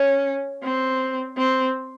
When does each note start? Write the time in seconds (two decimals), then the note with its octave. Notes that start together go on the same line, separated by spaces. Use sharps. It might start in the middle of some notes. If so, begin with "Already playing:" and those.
Already playing: C#4
0.63 C4
1.37 C4